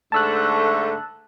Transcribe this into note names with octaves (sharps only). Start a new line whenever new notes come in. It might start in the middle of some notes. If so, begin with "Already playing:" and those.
G#2 D3 A3 A5 E6 F#6